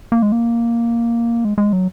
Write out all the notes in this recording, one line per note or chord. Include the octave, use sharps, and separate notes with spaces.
A#3
G#3
A#3
G#3
G#3
F#3